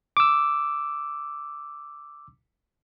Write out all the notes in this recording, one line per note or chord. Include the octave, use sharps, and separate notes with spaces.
D6 E6